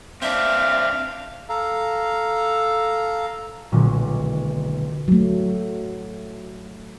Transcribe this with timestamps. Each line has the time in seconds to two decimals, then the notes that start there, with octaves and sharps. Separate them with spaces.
0.22 C4 D4 E5 F5
1.49 A4 F5 A#5
3.72 D#1 B1 A#2 D3 G#3 C#4
5.08 F#3 A3